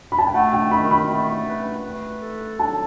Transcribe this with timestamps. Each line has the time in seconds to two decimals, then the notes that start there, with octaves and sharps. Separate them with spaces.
0.12 B5
0.18 A5
0.27 G5
0.34 A3 F#5
0.53 G5
0.71 D#3 B5
0.91 B5
1.09 A3
1.47 B4
1.85 A3
2.22 A4
2.59 F#3 A5